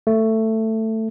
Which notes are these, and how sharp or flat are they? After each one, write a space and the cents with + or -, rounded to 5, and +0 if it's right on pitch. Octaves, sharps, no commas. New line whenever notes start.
A3 +10